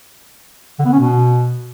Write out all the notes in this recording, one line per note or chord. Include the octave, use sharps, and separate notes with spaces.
D3
B3
C#4
B2